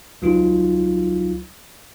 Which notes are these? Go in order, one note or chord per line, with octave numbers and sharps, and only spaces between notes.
C#2 F#3 D#4 F4